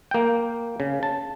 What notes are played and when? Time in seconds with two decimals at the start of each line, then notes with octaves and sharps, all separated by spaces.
0.11 A#3 G5
0.80 C#3
1.03 A5